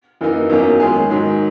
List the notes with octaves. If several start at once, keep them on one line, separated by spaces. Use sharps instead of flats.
F#2 E3 A#3 D#4
E2 D#3 F#3 A#3 C#4
D#3 G#3 C#4 G#4
G#2 D#3 F#3